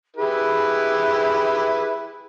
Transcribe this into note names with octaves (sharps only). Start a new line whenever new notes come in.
E4 G4 G#4 B4